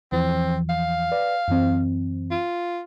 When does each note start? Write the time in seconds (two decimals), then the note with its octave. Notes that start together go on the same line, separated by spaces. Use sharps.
0.12 E2 E3 F3 C4
0.70 F5
1.12 B4 D5
1.48 F#2 E3 C4
2.31 F4